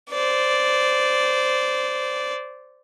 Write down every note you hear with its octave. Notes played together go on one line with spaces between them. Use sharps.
C5 D5